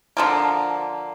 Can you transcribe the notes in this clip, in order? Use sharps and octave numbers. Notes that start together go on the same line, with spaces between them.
D3 F3 A#3